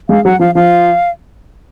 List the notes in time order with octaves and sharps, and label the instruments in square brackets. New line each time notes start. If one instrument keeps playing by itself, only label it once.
[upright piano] G#3 [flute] F5
[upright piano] F#3 [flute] F#5
[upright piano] F3 [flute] F5
[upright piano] F3 [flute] F5